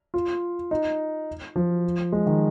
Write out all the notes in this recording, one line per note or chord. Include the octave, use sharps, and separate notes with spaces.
F4
D#4
F3
G#3
D#3